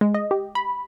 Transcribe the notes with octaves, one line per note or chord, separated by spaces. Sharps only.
G#3
D#5
G4
B5